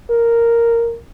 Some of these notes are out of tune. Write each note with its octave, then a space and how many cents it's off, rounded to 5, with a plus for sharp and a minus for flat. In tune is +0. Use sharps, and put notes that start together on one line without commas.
A#4 -5